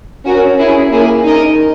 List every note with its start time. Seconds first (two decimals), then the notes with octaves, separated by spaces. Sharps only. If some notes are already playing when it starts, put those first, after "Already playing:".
0.25 C#4 F#4 A#4
0.57 C#4 E4 G#4
0.91 A#3 E4 G#4
1.24 D#4 A#4 D#5